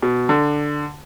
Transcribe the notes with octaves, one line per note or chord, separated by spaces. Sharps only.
B2
D3